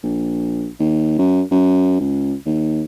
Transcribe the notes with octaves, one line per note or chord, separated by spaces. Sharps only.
A#1
D#2
F#2
F#2
C#2
D#2